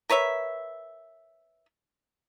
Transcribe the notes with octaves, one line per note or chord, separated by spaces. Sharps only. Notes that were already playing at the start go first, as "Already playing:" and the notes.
A#4 B4 C#5 E5